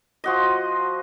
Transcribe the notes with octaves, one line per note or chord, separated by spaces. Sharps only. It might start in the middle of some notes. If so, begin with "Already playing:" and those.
F3 F#4 D#5